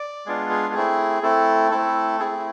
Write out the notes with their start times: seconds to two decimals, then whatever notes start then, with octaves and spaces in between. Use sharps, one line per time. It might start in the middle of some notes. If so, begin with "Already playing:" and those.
Already playing: D5
0.26 G#3 B3 D4 F4 G#4
0.50 G#4
0.74 A3 C4 E4 G#4
1.23 A3 C4 E4 A4
1.71 A3 C4 E4 A4
2.20 A3 C4 E4 G#4